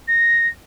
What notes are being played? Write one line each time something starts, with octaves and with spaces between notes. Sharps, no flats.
A#6